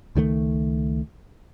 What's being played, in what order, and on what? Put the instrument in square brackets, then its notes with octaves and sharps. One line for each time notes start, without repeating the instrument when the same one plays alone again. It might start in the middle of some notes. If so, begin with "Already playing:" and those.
[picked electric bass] C#2 D#3 F3 A3